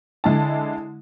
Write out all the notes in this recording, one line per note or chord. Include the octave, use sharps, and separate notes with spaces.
D3 G#3 E4 A5